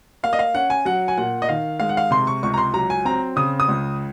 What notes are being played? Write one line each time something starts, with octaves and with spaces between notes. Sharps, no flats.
A#3 F5
D#5
F5
C#4 F#5
G#5
F#3 F#5
G#5
A#2 F#5
D#5
D#3 F5
G#3 F5
F#5
F5
C3 C6
C#6
C#2 C#6
A#5
C6
F#3 A#5
G#5
C4 A#5
C#3 D#6
D#6
C#2